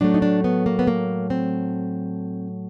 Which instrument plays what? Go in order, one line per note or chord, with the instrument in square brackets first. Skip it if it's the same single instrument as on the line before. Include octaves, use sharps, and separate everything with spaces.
[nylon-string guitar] A2 F#3 A3 D4
D#4
D4
B3
A#3
B3
A#3
C4